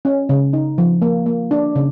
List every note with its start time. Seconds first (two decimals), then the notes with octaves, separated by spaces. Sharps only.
0.05 C#4
0.29 C#3
0.53 D#4
0.78 F3
1.02 A#3
1.26 A#3
1.51 D4
1.76 C#3